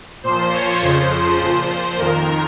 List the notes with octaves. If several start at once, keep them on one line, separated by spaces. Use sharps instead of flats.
A#2 F3 C5
C#5
F2 C#3 F3 C5
A#2 F3
F2 D#3 A#4